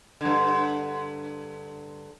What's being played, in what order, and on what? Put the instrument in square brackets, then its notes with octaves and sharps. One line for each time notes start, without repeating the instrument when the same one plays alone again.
[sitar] G2 D3